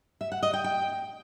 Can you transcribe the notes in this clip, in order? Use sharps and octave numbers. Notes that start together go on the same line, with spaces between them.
E5
F#5
D#5
G5
G5